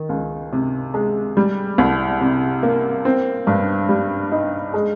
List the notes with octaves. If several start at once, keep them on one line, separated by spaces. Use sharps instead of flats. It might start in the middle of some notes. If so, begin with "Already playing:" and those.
Already playing: D#3
C#2
C3
G#3
G3
C2
C3
A#3
C4
G2
G3
D#4
G#3